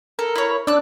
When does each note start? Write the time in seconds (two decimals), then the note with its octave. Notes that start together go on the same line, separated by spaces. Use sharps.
0.19 A4 A#4
0.36 E4 C#5
0.67 D4 D5 E6 F#6